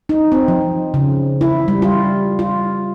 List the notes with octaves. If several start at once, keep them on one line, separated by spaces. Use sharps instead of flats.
D#4
C4
F3
C#3
E4
G3
F4
F4